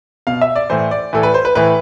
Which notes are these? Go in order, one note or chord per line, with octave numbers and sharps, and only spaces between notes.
B2 F5
E5
D5
A2 E3 C5
D5
A2 E3 A4
B4
C5
B4
A2 E3 B4